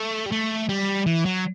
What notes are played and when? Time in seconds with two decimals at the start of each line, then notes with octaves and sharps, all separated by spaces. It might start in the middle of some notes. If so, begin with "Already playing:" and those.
Already playing: A3
0.26 G3
0.32 A3
0.69 G3
1.06 E3
1.25 F#3